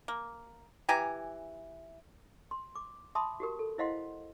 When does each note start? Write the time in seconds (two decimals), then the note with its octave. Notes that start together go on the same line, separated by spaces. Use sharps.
0.08 A#3
0.89 E3 G4 G#5 A#5
2.51 C6
2.76 D6
3.15 E5 A5 B5 C6 D6 D#6
3.40 F#4 G4 A#4
3.59 A4
3.78 E4 C5 D#5 F5 F#5 C6